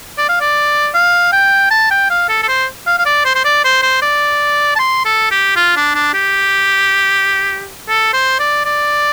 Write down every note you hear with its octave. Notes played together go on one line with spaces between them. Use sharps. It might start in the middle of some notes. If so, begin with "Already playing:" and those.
D5
F5
D5
F5
G5
A5
G5
F5
A4
A4
C5
F5
F5
D5
C5
C5
D5
C5
C5
D5
A5
C6
A4
G4
F4
D4
D4
G4
A4
C5
D5
D5